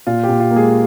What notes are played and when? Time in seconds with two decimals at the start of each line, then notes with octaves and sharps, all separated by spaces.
0.07 A#2 F4
0.23 G4
0.29 A#2
0.40 F4
0.51 A#3
0.56 G#3 G#4